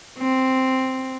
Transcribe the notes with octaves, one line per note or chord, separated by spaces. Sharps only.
C4